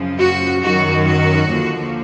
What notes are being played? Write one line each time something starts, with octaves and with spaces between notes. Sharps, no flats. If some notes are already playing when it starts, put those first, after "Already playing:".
Already playing: F#2 C#3 F3
F#4
F#2 D#3 F#3 F#4
F#4
D#2 D3 F3